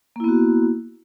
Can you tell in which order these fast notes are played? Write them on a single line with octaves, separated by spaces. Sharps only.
A#3 E4 B3 F#4